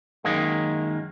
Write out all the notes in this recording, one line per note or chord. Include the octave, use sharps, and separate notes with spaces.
F#2 D#3 G#3 A#3